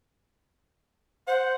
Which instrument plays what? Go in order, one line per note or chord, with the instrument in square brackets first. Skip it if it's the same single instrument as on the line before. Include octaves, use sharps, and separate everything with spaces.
[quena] C5 [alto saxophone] F#5